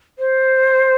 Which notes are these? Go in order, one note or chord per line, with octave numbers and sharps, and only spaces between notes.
C5